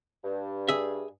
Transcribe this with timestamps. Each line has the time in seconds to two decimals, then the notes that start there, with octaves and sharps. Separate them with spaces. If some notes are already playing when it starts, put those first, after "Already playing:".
0.24 G2
0.68 G#4 E5